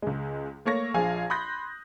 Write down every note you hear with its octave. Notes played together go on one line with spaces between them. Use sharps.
C#2 G#3
A3 A#3 C#5 C#6 A#6
A#1 F3 G#4 F5 G#5 G#6
B5 C6 D#6 F#6 G6 A#6